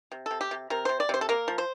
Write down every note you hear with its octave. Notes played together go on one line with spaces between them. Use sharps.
C3
C3 A4
G4
C3
C3 A#4
C3 C5
D5
C3 C5
A4
A#3 A#4
F3
C5